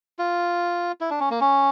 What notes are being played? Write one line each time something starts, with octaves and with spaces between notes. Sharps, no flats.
F4
E4
D4
C#4
A#3
C#4